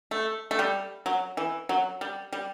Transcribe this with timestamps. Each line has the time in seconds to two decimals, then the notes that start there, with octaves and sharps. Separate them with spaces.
0.11 A3
0.51 A3
0.59 G3
1.06 F#3
1.37 E3
1.69 F#3
2.01 G3
2.33 G3